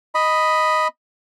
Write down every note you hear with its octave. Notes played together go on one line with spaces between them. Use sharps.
D#5 B5